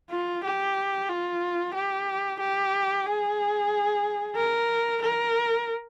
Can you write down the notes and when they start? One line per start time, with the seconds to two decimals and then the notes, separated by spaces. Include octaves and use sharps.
0.11 F4
0.44 G4
1.09 F4
1.74 G4
2.40 G4
3.06 G#4
4.36 A#4
5.02 A#4